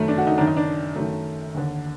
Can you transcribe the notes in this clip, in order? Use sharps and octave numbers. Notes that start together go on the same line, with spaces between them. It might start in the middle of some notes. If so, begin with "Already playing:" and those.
Already playing: F#2 D#3 A3
D4
F#4
D#4
F#2 D#3 D4
D#4
D4
F#2 D#3 A3
D#2 D3